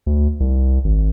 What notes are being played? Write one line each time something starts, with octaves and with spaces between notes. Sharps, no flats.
D2
C2
G#1